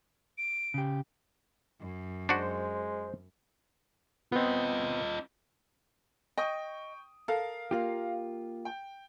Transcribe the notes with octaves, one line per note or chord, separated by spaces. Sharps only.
D7
C#3 G4
F#2
G#3 D4 F#4 C5
B3 C4 F4 D#5
D#5 G5 C#6 D#6
A4 A#4 F5
A#3 F4 G4
G5